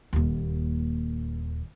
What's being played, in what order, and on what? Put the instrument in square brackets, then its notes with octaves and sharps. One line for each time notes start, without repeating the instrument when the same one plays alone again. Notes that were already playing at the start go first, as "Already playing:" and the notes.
[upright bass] D#1 D#2